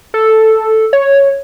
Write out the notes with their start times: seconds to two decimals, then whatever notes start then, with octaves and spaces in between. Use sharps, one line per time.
0.14 A4
0.93 C#5